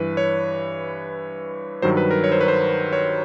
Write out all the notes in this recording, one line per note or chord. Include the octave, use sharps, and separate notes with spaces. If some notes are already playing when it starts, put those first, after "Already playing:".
Already playing: G2 E3 B4
C#5
G2 D#3 F#3 C5
B4
A#4
C#5
C5
B4
C5
C#5